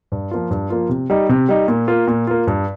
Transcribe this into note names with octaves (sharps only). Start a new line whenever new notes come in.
G2
F3 A#3 F4
G2
F3 A#3 F4
C3
G3 D#4
C3
G3 D#4
A#2
A#3 F4
A#2
A#3 F4
G2